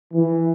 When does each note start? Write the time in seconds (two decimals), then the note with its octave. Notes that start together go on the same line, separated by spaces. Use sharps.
0.13 E3